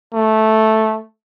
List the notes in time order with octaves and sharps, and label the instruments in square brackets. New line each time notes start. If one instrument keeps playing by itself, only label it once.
[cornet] A3